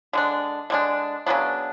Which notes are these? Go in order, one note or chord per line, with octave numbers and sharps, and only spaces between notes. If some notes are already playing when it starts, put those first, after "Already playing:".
D3 G#3 D4
D3 G#3 D4
C#3 F#3 B3 D4